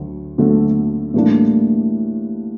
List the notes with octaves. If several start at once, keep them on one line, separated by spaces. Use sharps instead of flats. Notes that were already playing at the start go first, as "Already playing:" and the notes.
Already playing: D2 D3 F#3 A3
D2 D3 F#3 A3
A2 E3 G3 A#3 D4